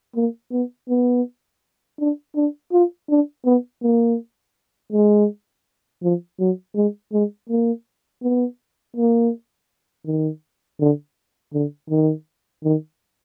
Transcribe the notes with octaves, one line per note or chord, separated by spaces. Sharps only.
A#3
B3
B3
D4
D4
F4
D4
B3
A#3
G#3
F3
F#3
G#3
G#3
A#3
B3
A#3
D#3
D3
D3
D#3
D#3